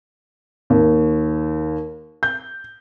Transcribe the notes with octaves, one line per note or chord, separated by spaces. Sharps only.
D#2
G6